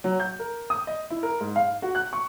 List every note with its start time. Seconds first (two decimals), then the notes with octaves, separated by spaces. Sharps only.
0.04 F#3
0.20 G6
0.39 A#4
0.70 D#6
0.87 D#5
1.10 E4
1.23 A#4
1.40 G#2
1.56 F5
1.82 F#4
1.95 F#6
2.13 C#6